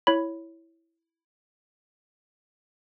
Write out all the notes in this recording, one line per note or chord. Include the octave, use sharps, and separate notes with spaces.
E4 C#5 B5